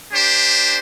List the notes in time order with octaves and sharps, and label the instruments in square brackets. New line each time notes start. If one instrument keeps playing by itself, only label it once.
[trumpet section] D4 G4 C5